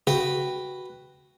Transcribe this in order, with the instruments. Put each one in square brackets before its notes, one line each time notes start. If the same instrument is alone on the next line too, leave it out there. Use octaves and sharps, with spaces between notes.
[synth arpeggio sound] C#3 [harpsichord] F#4 B4 G5